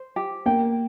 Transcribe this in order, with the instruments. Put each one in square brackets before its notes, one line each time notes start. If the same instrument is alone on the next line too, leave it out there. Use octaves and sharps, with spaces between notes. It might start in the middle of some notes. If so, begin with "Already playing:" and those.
Already playing: [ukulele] C5
G4
[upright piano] A#3 [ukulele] G5